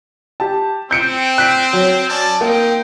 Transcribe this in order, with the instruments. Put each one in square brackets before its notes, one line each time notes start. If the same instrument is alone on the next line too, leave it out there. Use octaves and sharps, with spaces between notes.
[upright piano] G4 A5
[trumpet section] C4 [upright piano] G6 C#7 D7
[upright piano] F#6 B6 D7
F#3
[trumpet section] C#4 D5 A5
[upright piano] A#3 [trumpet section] C4 D#4 G5